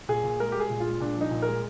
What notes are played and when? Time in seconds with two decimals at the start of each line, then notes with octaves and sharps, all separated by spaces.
0.09 A#2 G#4
0.24 A#2
0.40 G#3 A#4
0.52 G#3 G4
0.60 G#4
0.70 A#2
0.80 F4
0.86 G#3
1.00 A#2 D4
1.17 F3 D#4
1.31 A#2
1.42 G#3 A#4